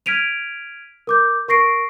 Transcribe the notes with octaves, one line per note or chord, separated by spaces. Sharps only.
F6 G#6 B6 D7 D#7 F7
A#4 D6 G6
A#4 C#6 A#6 C7 D7